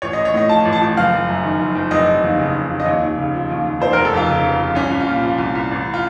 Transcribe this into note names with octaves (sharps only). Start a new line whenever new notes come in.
A1 C#5
D#5
A1
C#5
A2 D#5
F3 A5
A1
A5
A1
F#1 F5
F#1
F#2
D#3
F#1
F#1
F1 D#5
F1
D#2
C#3
F1
F1
D#5
D#2 C#5
D#2
C#3
F3
D#2
D#2
F1 C5
A#4
F1
A4
F2 F4
C#3
F1
F1
C2 C#4
C2
F4
A#2
F3
C2
C2
A1
F4